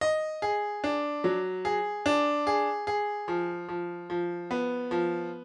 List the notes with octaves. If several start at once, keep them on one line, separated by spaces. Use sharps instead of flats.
D#5
G#4
D4
F#3
G#4
D4
G#4
G#4
F3
F3
F3
B3
F3